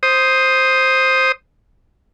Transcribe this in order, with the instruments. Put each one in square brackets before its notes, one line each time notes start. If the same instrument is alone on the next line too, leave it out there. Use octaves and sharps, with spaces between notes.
[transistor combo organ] C5 D#6